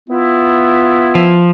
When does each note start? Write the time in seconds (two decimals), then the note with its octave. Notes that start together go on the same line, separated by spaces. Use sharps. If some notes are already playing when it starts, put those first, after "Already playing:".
0.09 B3 E4 F4
1.15 F3